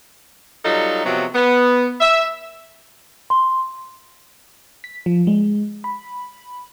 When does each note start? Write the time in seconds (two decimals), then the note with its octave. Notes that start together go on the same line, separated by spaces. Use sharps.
0.65 F#3 G3 D#4 F4 A4
1.05 C3 F3 F#3 B3
1.35 B3
2.01 E5
3.30 C6
4.84 B6
5.06 F3
5.27 G#3
5.84 B5